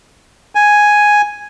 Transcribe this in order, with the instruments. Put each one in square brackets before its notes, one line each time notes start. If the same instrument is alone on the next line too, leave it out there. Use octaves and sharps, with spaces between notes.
[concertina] G#5